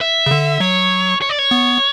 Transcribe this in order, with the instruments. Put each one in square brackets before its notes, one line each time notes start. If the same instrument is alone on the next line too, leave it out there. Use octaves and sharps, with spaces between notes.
[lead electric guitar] E5
[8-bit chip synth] C#3
D3
[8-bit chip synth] F#3 [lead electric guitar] C#5
[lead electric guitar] C#5
D5
C#5
[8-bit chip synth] B3